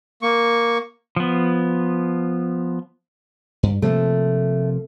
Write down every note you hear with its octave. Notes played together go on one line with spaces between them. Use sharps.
A#3 C#6
F3 B3
G2
C3 F3 A3 A#3